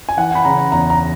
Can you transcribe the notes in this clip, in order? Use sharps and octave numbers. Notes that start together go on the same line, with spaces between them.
G#5
E3 F#5
B5
C#3 A#5
E2 A#5
A#5